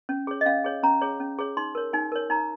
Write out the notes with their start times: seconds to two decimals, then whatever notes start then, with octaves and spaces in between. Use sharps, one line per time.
0.09 C#4
0.27 G#4 C#5
0.41 D#5
0.46 C#4 F5
0.64 G#4 C#5
0.83 C#4 A#5
1.01 G#4 C#5
1.20 C#4
1.38 G#4 C#5
1.57 D#4 C6
1.75 A#4 C#5
1.93 D#4 G#5
2.12 A#4 C#5
2.30 D#4 A#5